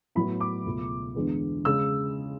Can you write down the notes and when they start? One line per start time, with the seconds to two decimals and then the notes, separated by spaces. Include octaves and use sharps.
0.15 A2 F#3 B3 B5
0.41 D6
0.65 C#2 B2 A3
1.15 E2 D3 G#3 B3
1.65 C#3 G#3 E6